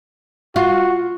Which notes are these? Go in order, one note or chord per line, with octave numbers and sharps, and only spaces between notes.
F4 F#4